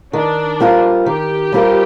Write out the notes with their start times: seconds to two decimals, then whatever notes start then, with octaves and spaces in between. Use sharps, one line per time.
0.13 D#3 D4
0.60 G3 C4 F4 A#4
1.06 D#3 G4
1.52 G3 C4 F4 A#4